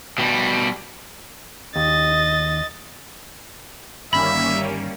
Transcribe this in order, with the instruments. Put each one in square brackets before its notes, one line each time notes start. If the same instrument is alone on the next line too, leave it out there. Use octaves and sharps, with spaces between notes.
[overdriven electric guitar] B2 G3
[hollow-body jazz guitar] D#2 [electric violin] D#5 A6
[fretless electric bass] G1 D#3 [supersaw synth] G3 A#3 C#4 [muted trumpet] E5 [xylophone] B5